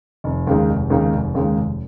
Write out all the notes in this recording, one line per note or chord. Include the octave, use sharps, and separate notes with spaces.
F1
D#2 C#3 G#3 D#4
F1
D#2 C#3 G#3 D#4
F1
D#2 C#3 G#3 D#4
F1